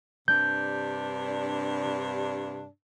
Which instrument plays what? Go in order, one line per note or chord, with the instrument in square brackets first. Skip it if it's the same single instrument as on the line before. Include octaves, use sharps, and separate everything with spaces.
[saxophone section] G2 C3 D4 [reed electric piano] G6